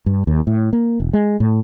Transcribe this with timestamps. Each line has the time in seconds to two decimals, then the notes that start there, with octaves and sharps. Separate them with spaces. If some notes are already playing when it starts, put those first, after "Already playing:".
0.06 G2
0.27 D#2
0.47 A2
0.73 A#3
1.00 E1
1.13 G#3
1.40 A2